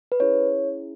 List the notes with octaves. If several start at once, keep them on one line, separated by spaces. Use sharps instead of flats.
B4
C#4 E4 G#4 C#5